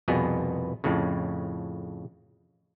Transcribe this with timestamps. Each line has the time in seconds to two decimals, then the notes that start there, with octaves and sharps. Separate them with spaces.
0.08 C2 F2 B2 B3 G#4
0.84 F2 A2 C#3